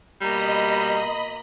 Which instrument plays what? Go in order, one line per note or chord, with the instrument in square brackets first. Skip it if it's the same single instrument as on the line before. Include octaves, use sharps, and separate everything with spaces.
[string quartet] B2 A#3 A#5 [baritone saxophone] G3 [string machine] D#5 B5